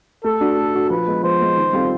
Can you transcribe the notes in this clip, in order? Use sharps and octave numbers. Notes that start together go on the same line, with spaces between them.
A3 A4
D4 F#4
A3
D4 F#4
F3 B4
G#3 B3
F3 C5
G#3 B3
D#3
G3 C4 F4 A4